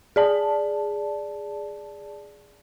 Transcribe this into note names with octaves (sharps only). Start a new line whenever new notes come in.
G#4 D5 A5